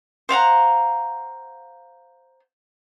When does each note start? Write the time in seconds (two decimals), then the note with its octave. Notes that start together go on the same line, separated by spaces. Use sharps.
0.29 C5 F5 F#5 A#5